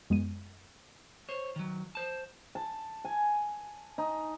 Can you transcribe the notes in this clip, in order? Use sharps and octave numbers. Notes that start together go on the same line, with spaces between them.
F#2 G#3 B3 D#7
C5 C#5
D#3 F#3
C5 A5
A5
G#5
D#4